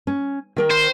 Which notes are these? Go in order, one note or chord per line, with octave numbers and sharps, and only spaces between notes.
C#4
D#3 A#4 G5
C5